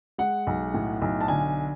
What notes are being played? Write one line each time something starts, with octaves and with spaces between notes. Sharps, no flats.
G#3 F#5
B1
A2
B1
A5
D3 G#5